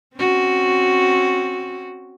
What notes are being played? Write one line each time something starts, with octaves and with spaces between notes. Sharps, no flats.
C4 C#4 F#4